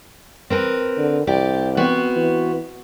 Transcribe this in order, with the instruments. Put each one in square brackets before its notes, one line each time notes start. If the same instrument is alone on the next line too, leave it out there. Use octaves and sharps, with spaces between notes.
[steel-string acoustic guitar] C4 A#4 B4
[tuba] D3
[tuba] C2 [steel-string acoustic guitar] G4 D5
[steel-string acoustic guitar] B3 C4 F#4
[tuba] E3